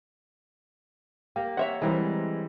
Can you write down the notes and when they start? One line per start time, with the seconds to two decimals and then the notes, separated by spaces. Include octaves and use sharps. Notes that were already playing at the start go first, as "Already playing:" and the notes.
1.36 A#3 G4
1.57 C#5 E5 F#5
1.82 E3 G3 G#3 C4 A#4